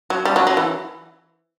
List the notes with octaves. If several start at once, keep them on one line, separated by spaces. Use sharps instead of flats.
F#3
G3
F#3
F#3
E3